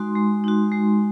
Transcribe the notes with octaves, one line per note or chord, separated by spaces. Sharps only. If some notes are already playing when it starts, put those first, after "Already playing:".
Already playing: G#3 D#4 F#4 C6
G#3
D#4 F#4
G#3